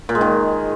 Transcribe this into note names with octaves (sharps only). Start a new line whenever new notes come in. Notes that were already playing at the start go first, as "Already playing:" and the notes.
A#2
G#3
D#3